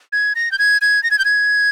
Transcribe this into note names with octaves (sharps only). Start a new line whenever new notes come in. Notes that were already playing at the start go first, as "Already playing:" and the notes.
G#6
A#6
G6
G#6
G#6
A#6
G#6
G6
G#6